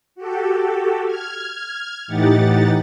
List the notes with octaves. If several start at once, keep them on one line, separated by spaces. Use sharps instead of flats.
F#4 G4 A4
F6 G#6
A2 E3 D#4 G4 F#5 A6